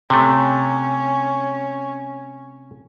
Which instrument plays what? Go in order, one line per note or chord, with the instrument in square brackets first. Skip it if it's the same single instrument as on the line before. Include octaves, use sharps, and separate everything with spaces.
[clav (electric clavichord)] C3 A3 [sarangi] C#4